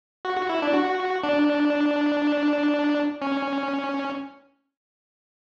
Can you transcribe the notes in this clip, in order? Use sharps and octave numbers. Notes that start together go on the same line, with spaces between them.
F#4
F#4
E4
D4
F#4
D4
C#4